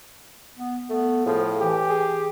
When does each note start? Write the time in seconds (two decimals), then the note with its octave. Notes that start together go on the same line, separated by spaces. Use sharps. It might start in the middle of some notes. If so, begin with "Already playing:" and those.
0.57 B3
0.90 A3 B3
1.27 A2 F3 G#4
1.60 E3 G4
1.90 G#4